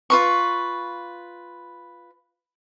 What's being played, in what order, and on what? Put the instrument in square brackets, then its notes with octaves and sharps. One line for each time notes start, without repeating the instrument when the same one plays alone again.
[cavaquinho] F4 B4 C#6